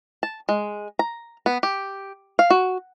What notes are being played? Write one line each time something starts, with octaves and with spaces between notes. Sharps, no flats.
A5
G#3
A#5
B3
G4
F5
F#4